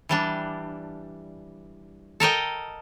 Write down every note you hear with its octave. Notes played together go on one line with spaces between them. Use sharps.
E3 G3 D4
A4 A#4 D#5 G5